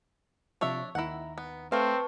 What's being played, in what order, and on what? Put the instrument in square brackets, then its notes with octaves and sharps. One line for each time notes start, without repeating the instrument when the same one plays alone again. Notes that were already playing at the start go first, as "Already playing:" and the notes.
[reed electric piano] C3 F3 C#6 [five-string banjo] D4 C#5 E5
[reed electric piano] D#2 D#3 A#5 [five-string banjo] E4 F#5
[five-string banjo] B3
[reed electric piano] A3 [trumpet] C4 [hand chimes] B4 A5 C#6 [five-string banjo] F5